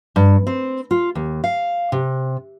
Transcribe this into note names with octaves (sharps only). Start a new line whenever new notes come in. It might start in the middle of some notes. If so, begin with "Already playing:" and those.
G2
C4
F4
D#2
F5
C3